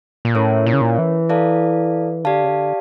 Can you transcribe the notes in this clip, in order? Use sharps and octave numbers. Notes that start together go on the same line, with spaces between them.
A#2
A2 C#4 E4 A#4 C#5
A#2
C#3
A#2
E3
E4 A4 D5 F5 A5
D3 G4 D5 F5 A5
C#3
D3